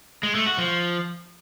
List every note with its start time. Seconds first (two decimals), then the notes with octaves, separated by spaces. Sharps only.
0.23 G#3
0.35 A3
0.47 F#4
0.58 F3